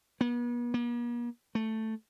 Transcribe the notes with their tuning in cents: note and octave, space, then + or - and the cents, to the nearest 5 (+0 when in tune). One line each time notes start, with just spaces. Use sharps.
B3 -40
A#3 +45
A3 +5